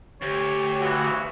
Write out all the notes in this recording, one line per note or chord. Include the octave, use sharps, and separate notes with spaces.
D2 G4 C#5
B1 C#3 E3 F#4